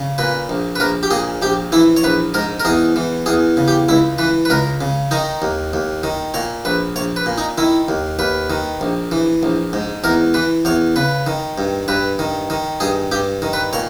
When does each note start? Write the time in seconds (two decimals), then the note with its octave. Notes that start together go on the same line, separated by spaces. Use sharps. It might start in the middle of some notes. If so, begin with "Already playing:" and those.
Already playing: C#3
0.18 A#2 B4
0.49 A#1
0.76 B4
0.80 A#1 A#4
1.03 G4
1.11 A#2 G#4
1.42 A#1 G4
1.72 E3 E4
1.97 C#5
2.03 A#1 B4
2.34 G#2 A#4
2.60 A#4
2.65 E2 G#4
2.96 E3
3.26 E2 G#4
3.57 C#3
3.68 G4
3.89 C#2 E4
4.18 E3 B4
4.45 B4
4.50 C#2 A#4
4.81 C#3
5.11 D#3 D#4
5.42 D#2
5.73 D#2
6.03 D#3
6.34 A#2 C#5
6.65 A#1 B4
6.96 A#1 C#5
7.16 B4
7.26 A#2
7.38 D#4
7.58 D#3 E4
7.88 D#2
8.19 D#2 B4
8.50 D#3
8.81 A#1
9.11 E3
9.43 A#1
9.73 G#2
10.04 E2 A#4
10.34 E3 B4
10.65 E2 C#5
10.96 C#3 B4
11.27 D#3
11.58 G2
11.88 G2 B4
12.19 D#3
12.50 D#3
12.80 G2 G#4
13.12 G2 G4
13.42 D#3
13.53 B4
13.73 A#2 C#5